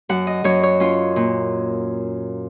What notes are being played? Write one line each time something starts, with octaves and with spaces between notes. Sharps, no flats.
F#2 F#5
D#5
F#2 C#5
C#5
C#4 F4
A#2